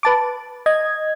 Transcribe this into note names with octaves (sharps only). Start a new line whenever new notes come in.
B4 A5 D6
D#5 G#6